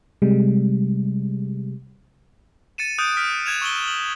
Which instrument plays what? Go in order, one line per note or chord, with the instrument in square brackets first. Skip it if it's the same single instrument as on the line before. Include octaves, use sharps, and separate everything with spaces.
[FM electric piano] C3 G3 G#3
[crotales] A6 C#7 D#7 E7
D#6 F#6 G6 D7 E7
F6 G6 B6 D7
F6 F#6 G#6 E7 F7
C#6 E6 D7 F#7 G7
F#7